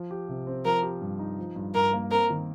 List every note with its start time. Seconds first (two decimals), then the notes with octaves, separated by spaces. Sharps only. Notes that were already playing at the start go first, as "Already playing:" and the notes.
Already playing: F3
0.11 G4
0.29 C3
0.47 C4
0.65 F3 A#4
0.83 G4
1.01 G2
1.19 D#4
1.38 F3
1.56 G2
1.75 G2 A#4
1.93 A#3
2.11 C4 A#4
2.30 D#3